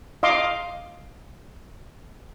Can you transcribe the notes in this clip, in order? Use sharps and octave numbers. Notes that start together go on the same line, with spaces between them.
D#5 F5 C6 D6